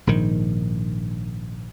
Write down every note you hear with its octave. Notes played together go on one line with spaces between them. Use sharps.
A#1 G#2 D#3